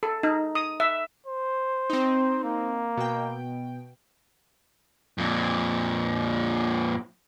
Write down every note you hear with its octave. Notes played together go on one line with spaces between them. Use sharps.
A4
D#4
D#6
E5
C5
C4 D#4
A#3
B2 G5
F2 A#2